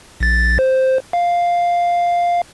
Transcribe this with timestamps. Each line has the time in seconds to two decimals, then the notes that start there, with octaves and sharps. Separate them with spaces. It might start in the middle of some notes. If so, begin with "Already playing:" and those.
0.20 A#1 A6
0.59 C5
1.13 F5